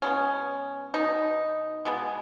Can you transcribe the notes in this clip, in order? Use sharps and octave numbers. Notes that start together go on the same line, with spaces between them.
B2 G#3 B3 C#4
B2 B3 D#4
B2 G#3 B3